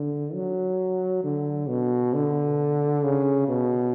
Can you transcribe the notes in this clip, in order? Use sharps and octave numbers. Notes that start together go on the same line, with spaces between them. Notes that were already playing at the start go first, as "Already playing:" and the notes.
Already playing: D3
F#3
D3
B2
D3
C#3
B2